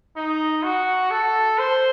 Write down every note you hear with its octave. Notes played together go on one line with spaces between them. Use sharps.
D#4
F#4
A4
C5